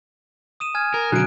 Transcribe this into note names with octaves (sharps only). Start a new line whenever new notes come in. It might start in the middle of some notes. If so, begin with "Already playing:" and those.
D#6 D#7 E7
G#5 F6 G#6
A#4
B2 D3 F#3 F#6 D7